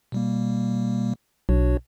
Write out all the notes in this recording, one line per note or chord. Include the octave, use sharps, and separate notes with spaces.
B2 G3 A#3
B1 D4 F#4 C#5